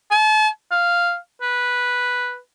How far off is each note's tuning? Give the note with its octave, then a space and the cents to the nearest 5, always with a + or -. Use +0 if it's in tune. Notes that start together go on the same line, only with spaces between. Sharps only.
A5 -40
F5 -5
B4 -5